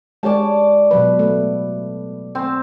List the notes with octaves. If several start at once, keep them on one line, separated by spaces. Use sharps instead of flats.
G#3 G4 C#5 D5 A5
B2 F#3 B4
A3
C4